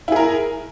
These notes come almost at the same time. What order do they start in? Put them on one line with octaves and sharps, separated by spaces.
E4 G#4 A#4